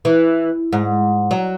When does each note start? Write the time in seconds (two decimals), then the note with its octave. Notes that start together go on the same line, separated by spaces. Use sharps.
0.05 E3
0.73 G#2
1.31 F#3